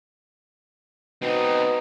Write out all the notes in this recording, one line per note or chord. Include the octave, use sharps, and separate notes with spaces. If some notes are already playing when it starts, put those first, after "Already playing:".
B2 C4 D#4